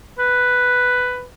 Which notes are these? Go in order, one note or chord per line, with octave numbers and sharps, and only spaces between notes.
B4